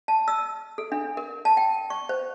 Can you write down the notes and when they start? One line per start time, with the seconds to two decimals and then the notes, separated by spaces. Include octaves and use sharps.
0.08 A5
0.28 E6
0.78 A4
0.92 D4
1.17 A#4
1.45 A5
1.57 G5
1.90 C#6
2.09 C5